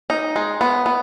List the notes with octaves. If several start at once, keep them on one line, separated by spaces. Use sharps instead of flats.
D#4
G#3
B3
B3